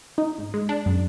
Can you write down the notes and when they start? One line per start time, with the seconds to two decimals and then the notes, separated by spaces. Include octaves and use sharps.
0.18 D#4
0.38 G#2
0.54 G#3
0.69 D4
0.86 F#2